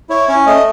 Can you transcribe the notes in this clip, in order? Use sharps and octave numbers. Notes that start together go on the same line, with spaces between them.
E4 C#5
C#4 C#5
A3 D#5